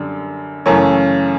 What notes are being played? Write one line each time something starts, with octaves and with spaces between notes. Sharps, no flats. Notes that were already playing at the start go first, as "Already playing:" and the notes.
Already playing: F#2 D3 G3
F#2 C#3 E3 A3 C#4